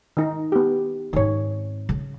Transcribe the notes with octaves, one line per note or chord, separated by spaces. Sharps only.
D#3 D#4
B3 G4
G#2 D#3 C4 C#5
C#3